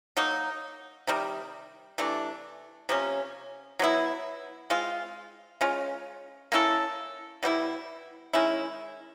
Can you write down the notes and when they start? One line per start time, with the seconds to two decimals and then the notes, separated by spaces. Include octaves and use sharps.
0.17 F#3 A#3 D#4
1.07 C3 D#3 G3
1.98 C3 E3 A3 D4
2.89 C3 F3 A#3 C#4
3.79 F#3 B3 E4
4.70 G#3 C4 F4
5.61 G#3 C#4 F4
6.52 A#3 C#4 E4 A4
7.43 B2 G3 C4 E4
8.33 D#3 G#3 C#4 E4